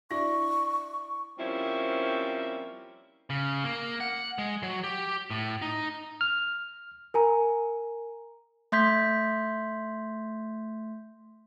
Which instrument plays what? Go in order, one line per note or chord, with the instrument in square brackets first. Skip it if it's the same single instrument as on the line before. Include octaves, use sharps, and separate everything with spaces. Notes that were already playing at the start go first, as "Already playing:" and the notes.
[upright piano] D4 E4 A#6 [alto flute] C#6
[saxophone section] F3 G3 A#3 C4 C#4 E4
[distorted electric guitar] C#3
A#3
F#5
G#3
F#3
G4
A2
D#4
[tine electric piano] F6
[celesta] A#4 G#5 A#5
[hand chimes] A3 E5 C6 G6 G#6 B6